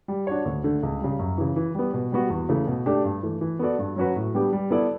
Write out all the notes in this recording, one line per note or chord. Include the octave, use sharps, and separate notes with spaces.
G3
D4 F#4 C#5
D2
D3 A3
C#2
C#3 G3
F#2
C#3 E3
E3
G3 B3
B2
G3 B3 F#4
E2
C#3 E3 A3
B2
A3 D4 G4
G2
E3 A3
E3
B3 F#4 A4 D5
G2
F#3 C#4 F#4 B4
A2
G3 B3 D4 G4
G3
B3 E4 A4 D5